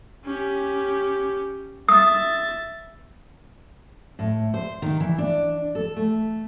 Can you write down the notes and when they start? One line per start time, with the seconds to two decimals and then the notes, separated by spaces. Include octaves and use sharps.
0.25 C#4 G4
1.89 E5 D#6 A6
4.19 A2
4.54 C5
4.82 D#3
5.00 E3
5.18 D4
5.75 A4
5.96 A3